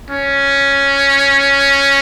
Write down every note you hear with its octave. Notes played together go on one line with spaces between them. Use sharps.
C#4